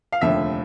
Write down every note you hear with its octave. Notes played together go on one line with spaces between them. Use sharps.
F5
F1 D#2 D3 F3 E5